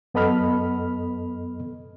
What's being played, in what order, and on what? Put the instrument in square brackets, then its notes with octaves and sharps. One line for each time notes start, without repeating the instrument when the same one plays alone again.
[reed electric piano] F#2 B3 A4 D#5 B5 F6